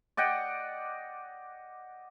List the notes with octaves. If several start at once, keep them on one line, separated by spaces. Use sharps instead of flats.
D5 D#5 F#5 G5